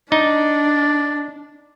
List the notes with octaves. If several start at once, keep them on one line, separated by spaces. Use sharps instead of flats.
D4 D#4 D5